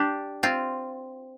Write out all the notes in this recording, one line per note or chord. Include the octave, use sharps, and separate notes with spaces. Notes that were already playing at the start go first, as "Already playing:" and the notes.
Already playing: D4 G4
C4 F4